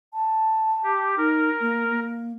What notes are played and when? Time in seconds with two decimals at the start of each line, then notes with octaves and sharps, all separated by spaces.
0.13 A5
0.83 G4
1.17 D#4 A#4
1.61 A#3
1.91 A#3